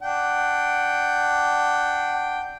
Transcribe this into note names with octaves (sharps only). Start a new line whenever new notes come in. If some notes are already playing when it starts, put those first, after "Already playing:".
D4 F#5 G5